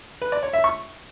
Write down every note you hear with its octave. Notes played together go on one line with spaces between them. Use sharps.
B4
D5
C#5
E5
C#6